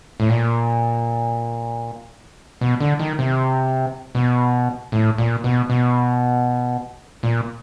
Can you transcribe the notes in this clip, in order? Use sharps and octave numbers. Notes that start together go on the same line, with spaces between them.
A2
A#2
B2
D3
D#3
C3
B2
A2
A#2
B2
B2
A#2